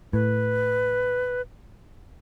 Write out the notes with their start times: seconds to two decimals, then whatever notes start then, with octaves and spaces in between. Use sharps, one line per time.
0.13 A2 B4